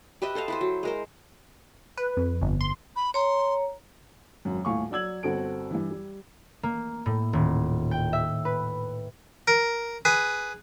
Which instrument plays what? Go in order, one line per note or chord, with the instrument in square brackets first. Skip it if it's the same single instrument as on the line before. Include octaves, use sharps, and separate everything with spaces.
[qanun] G4 B4 D#5 E5
A4 C5 D#5 F5
E4 B4 C5
F#3
G#3 A#4 C5
[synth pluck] B4
F2
G1
C6
[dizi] B5
[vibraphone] C#5 A#5 [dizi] C6
[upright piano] G#1 F#2
D#1 A2 F5 G#5 C#6
F#3 D5 E6 G#6 F#7
G1 C4 F#4 A4 D7
G2 E3
G3
[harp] A#3
A2
D#1
G5
E5
B4
[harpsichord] A#4
G#4 B4